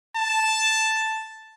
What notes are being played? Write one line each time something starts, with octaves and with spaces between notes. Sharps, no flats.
A5